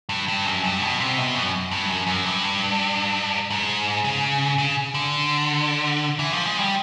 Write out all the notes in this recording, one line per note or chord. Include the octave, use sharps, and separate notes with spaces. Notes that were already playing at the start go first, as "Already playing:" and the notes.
G2
G2
F#2
G2
B2
C3
B2
F#2
G2
F#2
F#2
G2
G#2
C#3
C#3
D3
E3
F3
G#3
G3